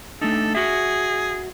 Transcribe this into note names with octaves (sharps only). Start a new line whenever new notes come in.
A3 D4 D#4 A4
F#4 G#4 E5